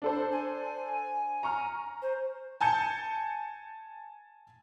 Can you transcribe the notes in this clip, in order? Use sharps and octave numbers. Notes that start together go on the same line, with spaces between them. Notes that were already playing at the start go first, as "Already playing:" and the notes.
D4 A4 C5
G#5
A#5 C#6 F6
C5
G#5 A5 G6 C#7